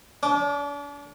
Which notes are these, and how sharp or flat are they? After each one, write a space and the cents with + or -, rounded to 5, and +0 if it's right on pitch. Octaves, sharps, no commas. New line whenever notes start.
D4 -40 D6 +0